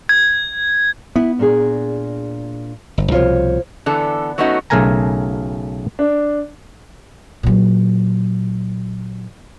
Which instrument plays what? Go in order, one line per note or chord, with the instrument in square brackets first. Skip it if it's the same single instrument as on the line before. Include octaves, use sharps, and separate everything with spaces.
[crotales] G#6
[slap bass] B3 [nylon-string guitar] E4
[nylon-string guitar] A#2 D4 G#4
[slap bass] G1
[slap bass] C2 B2 F3 [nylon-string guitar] F4 C5 C#5
[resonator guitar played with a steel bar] D3 E3 B3 A4
F#3 A3 B3 C#4 D#4 F#4
[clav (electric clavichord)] B1 C#3 A3 A#4 G#5 A#5
[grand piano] D4
[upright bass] A#2 F#3